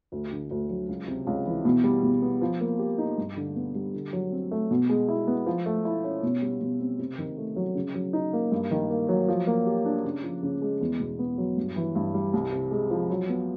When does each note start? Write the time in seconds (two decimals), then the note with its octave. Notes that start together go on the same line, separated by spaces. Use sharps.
0.12 D2
0.32 D3
0.51 D2
0.69 F#3
0.89 C#2
1.08 C3
1.27 C#2
1.46 E3
1.65 B2
1.84 G3
2.03 B2
2.22 B3
2.41 F3
2.60 A#3
2.79 G4
2.98 D#4
3.18 G2
3.36 D3
3.56 B3
3.75 G3
3.94 D3
4.13 F#3
4.32 C4
4.51 A3
4.71 B2
4.90 G#3
5.08 E4
5.27 B3
5.46 F3
5.66 A3
5.85 E4
6.04 C#4
6.23 B2
6.42 G3
6.61 B2
6.80 C4
6.99 C3
7.18 D#3
7.37 A3
7.56 F#3
7.75 C#3
7.94 F#3
8.13 D#4
8.33 A#3
8.52 G2
8.71 D#3
8.90 A#3
9.09 F#3
9.28 F3
9.47 A#3
9.66 G4
9.85 D4
10.04 C#3
10.23 F3
10.43 C#3
10.62 G#3
10.81 E2
11.00 B2
11.19 B3
11.38 F#3
11.57 G2
11.76 E3
11.95 G2
12.14 G3
12.33 C2
12.52 C3
12.71 G#3
12.90 F3
13.10 F#3
13.29 B3